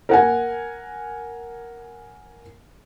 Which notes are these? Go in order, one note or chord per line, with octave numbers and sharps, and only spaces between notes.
A#4 F#5 G#5